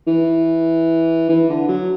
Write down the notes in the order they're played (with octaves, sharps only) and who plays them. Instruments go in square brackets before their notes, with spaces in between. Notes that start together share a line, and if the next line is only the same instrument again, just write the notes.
[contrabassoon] E3
E3
D3
F#3